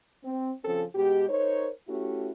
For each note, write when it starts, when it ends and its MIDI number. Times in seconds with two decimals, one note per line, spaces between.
0.24 0.51 60
0.64 0.83 49
0.64 0.83 53
0.64 0.83 60
0.64 0.83 61
0.64 0.83 69
0.95 1.26 47
0.95 1.26 56
0.95 1.26 67
1.28 1.69 63
1.28 1.69 70
1.28 1.69 72
1.28 1.69 73
1.88 2.32 57
1.88 2.32 61
1.88 2.32 64
1.88 2.32 66
1.88 2.32 67